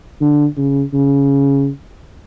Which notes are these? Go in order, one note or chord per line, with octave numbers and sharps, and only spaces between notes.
D3
C#3
C#3